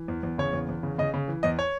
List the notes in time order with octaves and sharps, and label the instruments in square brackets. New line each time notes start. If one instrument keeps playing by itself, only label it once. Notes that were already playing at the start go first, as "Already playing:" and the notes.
Already playing: [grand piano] E3
E2
E2
C#3 C#5
E2
E2
C#3
C#3 D#5
C#3
E3
E2 D#5
C#5